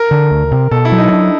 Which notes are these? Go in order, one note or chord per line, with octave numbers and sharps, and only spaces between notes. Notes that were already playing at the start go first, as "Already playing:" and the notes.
Already playing: A#4
D3
D2
C3
B2 A4
E4
F#3
D#4
D4